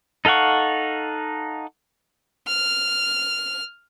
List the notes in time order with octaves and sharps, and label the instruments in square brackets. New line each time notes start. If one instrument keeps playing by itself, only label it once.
[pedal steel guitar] D#4 A4 F5 F#5 C#6
[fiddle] F6